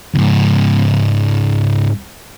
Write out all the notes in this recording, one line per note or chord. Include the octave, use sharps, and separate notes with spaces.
C#2 G#2